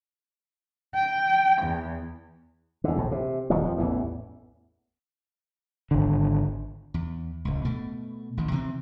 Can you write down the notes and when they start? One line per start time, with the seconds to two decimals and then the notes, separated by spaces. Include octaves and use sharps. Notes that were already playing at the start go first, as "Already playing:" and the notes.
0.95 G5
1.63 E2
2.84 E2 D3
2.97 A#1 A2
3.11 C3
3.50 D#1 D#2 F3 F#3
3.63 F2 F3
3.78 A1 E2 E3
5.91 G#1 D3
6.94 E2
7.45 D1 C#2
7.65 B2 A3
8.37 A1 D#3
8.51 C3 E3 G#3 C4